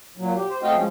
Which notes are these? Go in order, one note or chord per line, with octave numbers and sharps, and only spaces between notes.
A#2 F#3
G4
C5
A3 C4 F#4 D#5 F5 G5
F3 G#3 C#4